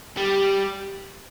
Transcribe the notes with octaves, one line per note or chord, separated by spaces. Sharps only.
G3